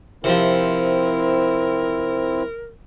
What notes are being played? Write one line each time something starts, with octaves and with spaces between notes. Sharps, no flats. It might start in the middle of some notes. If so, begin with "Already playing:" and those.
C3 F3 C4 E4 A#4